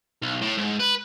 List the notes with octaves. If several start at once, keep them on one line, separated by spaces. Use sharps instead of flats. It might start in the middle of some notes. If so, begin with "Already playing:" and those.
B1
A2
G#2
B4